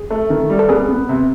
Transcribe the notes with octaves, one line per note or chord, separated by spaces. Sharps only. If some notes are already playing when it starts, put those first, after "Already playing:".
Already playing: G#4
A3
D#3
G3
A4
B3 G#4 A#4
B3
C3